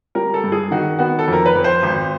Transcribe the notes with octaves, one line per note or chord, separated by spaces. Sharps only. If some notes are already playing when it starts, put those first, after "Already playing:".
G3 A#4
A4
G2
G#4
D#3 F#4
B3 F#4
A4
F2 A#4
B4
F2
C5
G#1